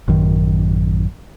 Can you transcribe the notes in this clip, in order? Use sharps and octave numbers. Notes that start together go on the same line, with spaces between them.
A1 F#2 D#3